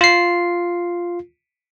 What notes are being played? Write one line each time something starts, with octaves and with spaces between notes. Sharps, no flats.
F4 C7